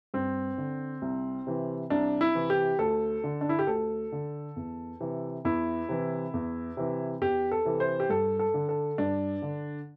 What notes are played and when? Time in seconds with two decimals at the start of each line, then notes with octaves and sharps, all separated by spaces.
0.14 G2 C4
0.58 D3
1.02 C2
1.47 C3 E3
1.90 C2 D4
2.21 E4
2.35 C3 E3
2.50 G4
2.79 D2 A4
3.24 D3
3.41 D4
3.49 E4
3.59 G4
3.67 D2 A4
4.12 D3
4.56 E2
5.01 C3 E3
5.45 E2 E4
5.89 C3 E3
6.34 E2
6.77 C3 E3
7.21 E2 G4
7.51 A4
7.65 C3 E3
7.80 C5
8.00 G4
8.09 G2 A4
8.39 A4
8.54 D3
8.69 A4
8.98 G2 D4
9.42 D3